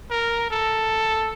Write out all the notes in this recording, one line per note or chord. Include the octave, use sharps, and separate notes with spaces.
A#4
A4